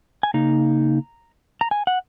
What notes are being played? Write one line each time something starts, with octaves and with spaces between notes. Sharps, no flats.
G#5
C#3 A#3 D#4 A#5
A#5
G#5
F#5